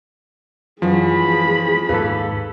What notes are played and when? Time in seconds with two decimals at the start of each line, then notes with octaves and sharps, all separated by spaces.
0.82 F#2 E3 F3 G#4 B5
1.89 D#2 G#2 A4 B4 F5